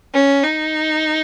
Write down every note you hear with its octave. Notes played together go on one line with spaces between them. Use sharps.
C#4
D#4